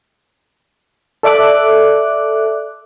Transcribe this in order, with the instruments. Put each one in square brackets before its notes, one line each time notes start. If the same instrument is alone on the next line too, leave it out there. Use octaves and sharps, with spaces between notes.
[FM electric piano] A4 D5 E5 D6 F#6